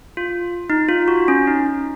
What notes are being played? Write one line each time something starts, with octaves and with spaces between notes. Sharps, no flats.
F4
D#4
F4
F#4
C#4
D#4